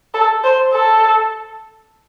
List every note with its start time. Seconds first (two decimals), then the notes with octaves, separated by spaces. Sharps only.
0.14 A4
0.44 C5
0.73 A4